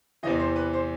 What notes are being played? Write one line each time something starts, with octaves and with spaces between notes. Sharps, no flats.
E2 C3 E3 D#5
C5
B4
C5